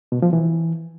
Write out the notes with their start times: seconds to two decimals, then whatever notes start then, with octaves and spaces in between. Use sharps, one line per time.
0.12 B2
0.22 F3
0.33 E3